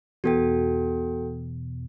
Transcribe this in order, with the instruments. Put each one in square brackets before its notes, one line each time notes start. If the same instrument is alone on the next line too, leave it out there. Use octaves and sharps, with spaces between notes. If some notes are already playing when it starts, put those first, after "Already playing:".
[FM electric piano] E2 B2 [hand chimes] F#4 A4 G5